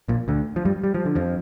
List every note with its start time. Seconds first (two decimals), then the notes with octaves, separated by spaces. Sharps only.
0.08 A#1 A#2
0.28 D2 D3
0.56 F3
0.65 G2 G3
0.84 G3
0.95 F3
1.05 D3
1.15 F2 F3